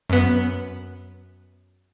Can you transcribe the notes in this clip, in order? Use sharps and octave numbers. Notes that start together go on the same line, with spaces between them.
F#2 B3